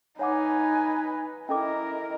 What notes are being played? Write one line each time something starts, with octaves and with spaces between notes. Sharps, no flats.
D#4 B4 C#5 F#5 G#5 D6
C#4 E4 A4 A#4 D#5 D6